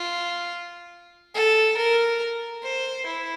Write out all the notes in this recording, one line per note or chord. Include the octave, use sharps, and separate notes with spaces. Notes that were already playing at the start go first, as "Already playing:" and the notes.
Already playing: F4
A4
A#4
C5
E4